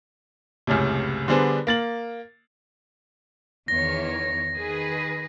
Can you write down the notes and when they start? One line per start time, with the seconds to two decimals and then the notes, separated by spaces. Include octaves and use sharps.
0.67 C#2 F#2 A2 C3
1.28 D3 G3 B3 D4 G#4 C5
1.67 A#3 A6 F#7
3.68 E2 D#3 C#5 A#6
4.55 D#3 G#4 B4